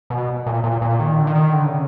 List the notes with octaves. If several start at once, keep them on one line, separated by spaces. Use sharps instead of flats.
B2
A#2
A#2
A#2
D#3
D3
D#3
D3
C#3